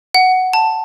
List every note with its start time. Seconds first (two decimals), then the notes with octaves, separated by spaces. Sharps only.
0.15 F#5
0.53 A5